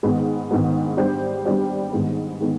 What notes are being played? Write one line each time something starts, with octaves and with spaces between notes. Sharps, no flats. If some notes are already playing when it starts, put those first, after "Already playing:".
G#2 D#3 G#3 B3
G#2 D#3 G#3 B3
G3 B3 D4 G4 C5
G3 B3 D4 G4 C5
G#2 D#3 G#3 B3
D#3 G#3 B3